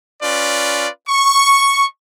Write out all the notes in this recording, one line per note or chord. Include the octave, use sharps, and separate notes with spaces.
C#4 F4 B4 D5
C#6